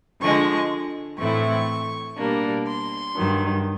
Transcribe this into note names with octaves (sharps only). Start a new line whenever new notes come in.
D3 F3 G#3 C#6
A2 E3 A3 C4 E4 C#6
B2 G3 A#3 D4
C6
G2 D#3 F#3